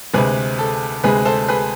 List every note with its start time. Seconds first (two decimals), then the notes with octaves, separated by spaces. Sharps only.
0.14 D2 C3 G#3 G#4 B4
0.58 A4
1.04 D2 C3 G#3 G#4 B4
1.25 A4 C5
1.48 G#4 B4